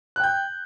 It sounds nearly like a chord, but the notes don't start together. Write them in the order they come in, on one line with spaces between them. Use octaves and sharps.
F#6 G5 G6